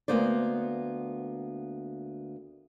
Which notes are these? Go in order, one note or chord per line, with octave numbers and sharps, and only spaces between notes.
D2 A#3 B3 C5 D5